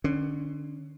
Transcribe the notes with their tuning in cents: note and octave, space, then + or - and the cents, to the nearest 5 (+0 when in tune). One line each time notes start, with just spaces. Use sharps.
D3 +30 C#4 +0